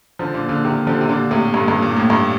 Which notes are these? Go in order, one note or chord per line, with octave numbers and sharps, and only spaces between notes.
D3 F3
A#2 D3
A#2 D3
C3 D#3
D3 F3
C3
A#2 D3
A2 C3
G2
G2
A#2
A2
G2 A#2